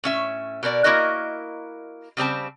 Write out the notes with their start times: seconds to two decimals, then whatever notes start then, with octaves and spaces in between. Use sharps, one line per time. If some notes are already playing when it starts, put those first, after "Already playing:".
0.04 A2 C#4 E5
0.63 B2 A#4 C5 D5
0.84 A#3 B3 E4 F#4 A#4 D#5
2.17 C#3 G3 C4 A5